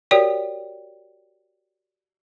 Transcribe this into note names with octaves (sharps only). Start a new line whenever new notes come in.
F#4 G4 A#4 C#5 D5 G5